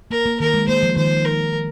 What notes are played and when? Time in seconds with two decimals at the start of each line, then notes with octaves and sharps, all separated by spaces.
0.11 A#3 A#4
0.26 A#3
0.40 D#3 A#4
0.54 G#3
0.68 A#3 C5
0.83 F3
0.97 D#3 C5
1.25 A#4